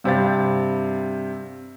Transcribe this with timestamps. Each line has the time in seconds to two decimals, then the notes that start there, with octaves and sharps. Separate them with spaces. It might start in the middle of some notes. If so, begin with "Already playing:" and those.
0.04 G2 C3 G3 C5 F5 A6